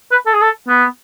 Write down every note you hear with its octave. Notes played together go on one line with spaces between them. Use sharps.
B4
A4
G#4
A4
B3